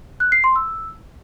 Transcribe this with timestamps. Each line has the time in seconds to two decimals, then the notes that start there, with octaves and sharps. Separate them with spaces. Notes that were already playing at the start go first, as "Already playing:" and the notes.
0.20 F#6
0.32 C7
0.44 C6
0.56 E6